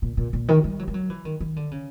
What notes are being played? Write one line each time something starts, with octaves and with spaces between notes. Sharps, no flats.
A#2
A#2
A#2
D#3
G3
F#3
G3
F#3
E3
D#3
D#3
D3
C#3